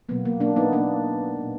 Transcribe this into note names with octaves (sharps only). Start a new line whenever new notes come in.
B2 F#3 A#3 B3
A#3
A#3 D4
B3 D#4
A#3 D4
A#2 G#3